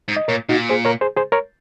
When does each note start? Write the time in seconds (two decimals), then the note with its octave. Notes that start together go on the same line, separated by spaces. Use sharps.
0.08 G#2
0.16 D#5
0.28 A#2 A#4 C#5
0.49 A#2 D#4 F#4
0.69 G#4 C5
0.85 A#4 C#5
1.01 G#4 C5
1.16 G#4 C5
1.32 A#4 C#5